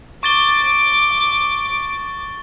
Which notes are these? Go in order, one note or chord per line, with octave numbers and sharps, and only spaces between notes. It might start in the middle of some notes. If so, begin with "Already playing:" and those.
C#6 D6 A6 G7